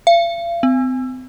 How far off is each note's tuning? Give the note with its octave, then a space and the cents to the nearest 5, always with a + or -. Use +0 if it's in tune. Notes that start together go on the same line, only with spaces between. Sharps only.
F5 -40
C4 -35